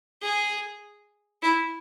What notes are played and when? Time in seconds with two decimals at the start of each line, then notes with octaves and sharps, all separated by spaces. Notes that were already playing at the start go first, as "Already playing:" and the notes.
0.22 G#4
1.42 E4